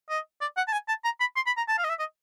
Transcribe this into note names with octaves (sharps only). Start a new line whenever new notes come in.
D#5
D5
F#5
A5
G#5
A5
A#5
B5
C6
B5
A#5
A5
F5
D#5
E5
D#5